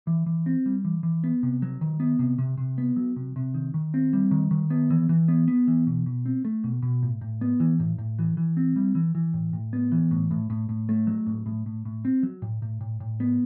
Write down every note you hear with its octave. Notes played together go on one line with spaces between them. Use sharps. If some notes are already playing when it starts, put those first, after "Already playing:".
E3
E3
C4
G3
E3
E3
B3
C3
F#3
D#3
B3
C3
C3
C3
B3
F#3
C3
C3
D#3
D#3
C4
G3
D#3
D#3
B3
E3
E3
B3
B3
E3
B2
B2
C4
A3
B2
B2
A2
A2
B3
E3
A2
A2
E3
E3
C4
G3
E3
E3
A2
A2
B3
E3
A2
A2
A2
A2
A3
F#3
A2
A2
A2
A2
C4
F#3
A2
A2
A2
A2
B3